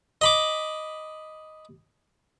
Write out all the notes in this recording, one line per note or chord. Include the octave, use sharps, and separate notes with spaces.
D#5 B5 D6